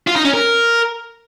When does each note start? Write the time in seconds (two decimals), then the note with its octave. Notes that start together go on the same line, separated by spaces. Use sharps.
0.07 F4
0.16 D#4
0.25 C#4
0.33 A#4